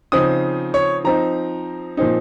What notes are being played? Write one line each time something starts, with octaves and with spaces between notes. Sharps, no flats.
C#3 F3 C4 D#4 D#6
C#5
F3 C4 D#4 A#5
A#2 F3 C4 D#4